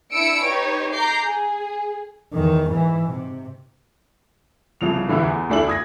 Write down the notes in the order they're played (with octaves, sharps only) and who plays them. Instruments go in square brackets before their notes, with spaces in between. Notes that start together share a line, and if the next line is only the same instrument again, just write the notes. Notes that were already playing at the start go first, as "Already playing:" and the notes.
[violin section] D4 E4 E6 C#7 D7
D#4 G4 B4 C#5
A#5 D6 G6 C7
G#4
[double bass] E2 D#3
G#2 E3
C3
[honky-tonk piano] C2 C#3 F3 F7
A2 D3 E3 B3 E4
E2
D2 A3 D4 E4 F#7
D#6 G#6 A#6